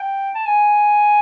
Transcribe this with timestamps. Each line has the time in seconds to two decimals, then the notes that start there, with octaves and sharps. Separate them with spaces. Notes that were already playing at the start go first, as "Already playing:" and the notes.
Already playing: G5
0.35 A5
0.46 G#5